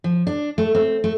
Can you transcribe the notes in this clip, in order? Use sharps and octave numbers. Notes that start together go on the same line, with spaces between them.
F3
D4
A3
C4
A3